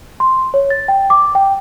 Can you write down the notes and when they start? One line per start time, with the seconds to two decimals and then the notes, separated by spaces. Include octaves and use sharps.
0.20 C6
0.54 C#5
0.70 A6
0.88 G5
1.10 D6
1.35 G5